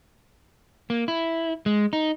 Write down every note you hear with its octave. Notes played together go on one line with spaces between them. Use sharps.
A#3
E4
G#3
D#4